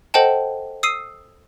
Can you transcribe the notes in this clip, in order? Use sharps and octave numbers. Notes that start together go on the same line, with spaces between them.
A4 C5 D#5 F#5 G5 A5
D#6 E6 C7 D#7